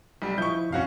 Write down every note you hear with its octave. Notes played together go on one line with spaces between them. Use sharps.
B1 G3
F3 E4 D#5 C#6 G6
F2 C#4 F#4 F5